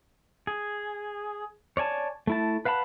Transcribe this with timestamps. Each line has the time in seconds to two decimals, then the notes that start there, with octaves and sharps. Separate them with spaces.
0.47 G#4
1.77 C#5 D5 G#5 A5
2.27 A3 E4 A5
2.65 B4 F5 F#5 A5 B5